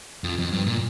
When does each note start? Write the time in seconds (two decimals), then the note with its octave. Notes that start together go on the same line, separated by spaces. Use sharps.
0.24 F2
0.38 F2
0.52 G2
0.66 A#2